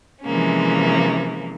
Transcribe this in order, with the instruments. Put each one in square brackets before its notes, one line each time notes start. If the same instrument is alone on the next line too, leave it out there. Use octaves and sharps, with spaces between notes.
[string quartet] C3 E3 F3 G#3 A#3 C#4